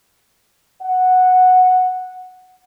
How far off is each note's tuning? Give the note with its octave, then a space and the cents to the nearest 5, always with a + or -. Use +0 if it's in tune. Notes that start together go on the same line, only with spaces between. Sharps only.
F#5 -5